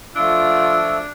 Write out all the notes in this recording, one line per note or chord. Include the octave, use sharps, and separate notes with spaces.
F3 A3 D4 F4 E6